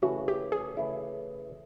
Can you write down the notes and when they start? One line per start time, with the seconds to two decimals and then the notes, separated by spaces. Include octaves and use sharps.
0.02 C#3 E3 A3 C#4 E4 F#4
0.28 G4
0.52 G#4
0.77 C#3 E3 A3 C#4 E4